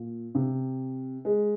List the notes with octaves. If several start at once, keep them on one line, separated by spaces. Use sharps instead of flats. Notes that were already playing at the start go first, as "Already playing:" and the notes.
Already playing: A#2
C3
G#3